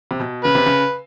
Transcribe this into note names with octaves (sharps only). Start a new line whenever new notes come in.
C3
B2
C#3 B4
C3
C#3